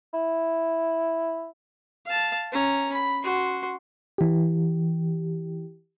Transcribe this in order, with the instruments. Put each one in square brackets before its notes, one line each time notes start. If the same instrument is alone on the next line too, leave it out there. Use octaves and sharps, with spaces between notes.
[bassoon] E4
[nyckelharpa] F5 A5
C#4 A#5
B5
F#4 C6
[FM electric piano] E3 G4